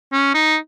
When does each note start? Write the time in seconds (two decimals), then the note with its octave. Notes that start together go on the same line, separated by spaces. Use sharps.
0.13 C#4
0.34 D#4